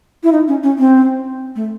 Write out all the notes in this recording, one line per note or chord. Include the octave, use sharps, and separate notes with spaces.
E4
D#4
C#4
C#4
C4
A3